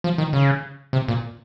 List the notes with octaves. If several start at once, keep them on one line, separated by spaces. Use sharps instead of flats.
F3
D#3
C#3
C3
A#2